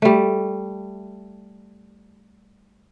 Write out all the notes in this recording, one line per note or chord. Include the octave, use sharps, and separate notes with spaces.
G3 A3